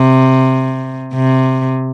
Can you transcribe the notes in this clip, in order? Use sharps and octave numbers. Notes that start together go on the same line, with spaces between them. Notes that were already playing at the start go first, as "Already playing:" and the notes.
Already playing: C3
C3